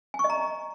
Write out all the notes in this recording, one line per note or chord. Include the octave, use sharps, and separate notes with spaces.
G#5
C#6
D#5
A#5